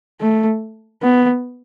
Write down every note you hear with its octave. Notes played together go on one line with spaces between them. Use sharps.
A3
B3